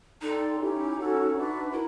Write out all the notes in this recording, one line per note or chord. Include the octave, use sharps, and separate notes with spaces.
D#4 A4 D5 G5 C6
C#4 E4 G4
C#4 F#4 A4
D4 F#4 B4 E5
E4 A#4